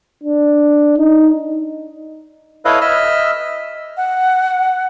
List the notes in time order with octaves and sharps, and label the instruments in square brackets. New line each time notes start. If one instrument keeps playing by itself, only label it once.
[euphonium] D4
D#4
[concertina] E4 A4 B4 C#5 D#5 F5
D#5 E5 E6 F6
[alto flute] F#5